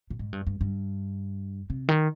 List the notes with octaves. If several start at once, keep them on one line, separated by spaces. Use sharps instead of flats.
A#2
G#2
G2
G2
G2
C3
D#3